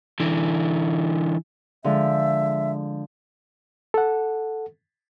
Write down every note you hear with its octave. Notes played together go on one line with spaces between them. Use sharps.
D3 E3
D3 F3 G#3 E5
A4 F#5